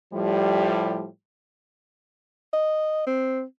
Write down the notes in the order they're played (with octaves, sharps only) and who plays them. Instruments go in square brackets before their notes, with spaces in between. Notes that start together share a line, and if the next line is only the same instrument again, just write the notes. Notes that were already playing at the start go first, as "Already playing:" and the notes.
[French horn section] A2 F3 G3
[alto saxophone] D#5
C4